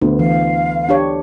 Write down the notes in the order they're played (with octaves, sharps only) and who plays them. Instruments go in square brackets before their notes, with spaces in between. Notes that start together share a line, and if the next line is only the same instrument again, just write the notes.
[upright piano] D2 [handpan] B3
[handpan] E3 [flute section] F5
[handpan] D4 G4 C#5